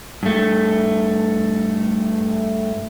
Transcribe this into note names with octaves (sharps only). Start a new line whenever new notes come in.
G2 A3